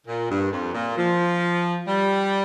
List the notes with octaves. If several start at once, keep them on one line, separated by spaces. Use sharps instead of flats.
A#2
G2
F2
A#2
F3
G3